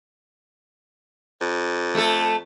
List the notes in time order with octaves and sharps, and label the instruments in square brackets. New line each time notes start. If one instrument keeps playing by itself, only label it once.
[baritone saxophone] F2
[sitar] A3 A4